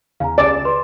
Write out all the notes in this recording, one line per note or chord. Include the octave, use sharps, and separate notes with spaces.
E2 C#3 F5 G#5 A#5
C#2 C#3 D5 G#5 A6 E7
B4 C6